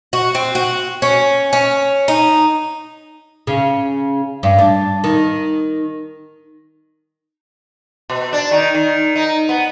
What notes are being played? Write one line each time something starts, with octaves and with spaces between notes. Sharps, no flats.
F#4
C4
F#4
C#4
C#4
D#4
C#3
G2
D4
D#3
B2
D4
D#3
D#3
D#4
B3